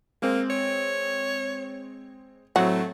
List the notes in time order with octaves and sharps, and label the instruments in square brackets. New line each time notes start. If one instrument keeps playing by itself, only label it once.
[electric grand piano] G#3 C4 [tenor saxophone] A#3
[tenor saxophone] C#5
[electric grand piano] A2 F#3 C4 [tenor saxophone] A3 [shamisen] F#4